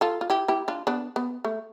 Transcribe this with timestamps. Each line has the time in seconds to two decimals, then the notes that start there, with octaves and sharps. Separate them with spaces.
0.01 F4 A4
0.21 F4
0.30 E4 G4
0.48 E4 G4
0.68 D4 F4
0.87 B3 D4
1.16 B3
1.45 A3